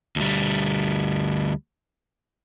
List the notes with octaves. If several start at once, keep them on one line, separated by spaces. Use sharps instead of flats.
D2 G3